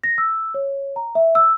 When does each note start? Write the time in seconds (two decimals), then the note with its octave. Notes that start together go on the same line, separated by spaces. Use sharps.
0.04 A#6
0.18 E6
0.54 C#5
0.96 A#5
1.15 E5
1.35 E6